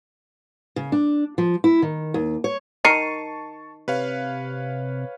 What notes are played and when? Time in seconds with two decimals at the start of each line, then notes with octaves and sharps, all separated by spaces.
0.76 C#3
0.92 D4
1.38 F3
1.64 E4
1.82 D#3
2.14 D#2
2.44 C#5
2.85 D#3 A#4 A5 C#6 C7 C#7 D#7
3.88 C3 B4 C#5 F5